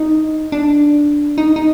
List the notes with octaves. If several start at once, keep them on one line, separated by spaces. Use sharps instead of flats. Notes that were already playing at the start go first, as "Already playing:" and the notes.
Already playing: D#4
D4
D#4
D#4